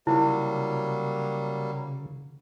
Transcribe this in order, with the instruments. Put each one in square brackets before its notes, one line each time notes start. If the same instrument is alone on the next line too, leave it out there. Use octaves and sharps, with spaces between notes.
[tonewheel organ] C#3 [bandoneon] F#3 G3 A#3 [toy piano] E4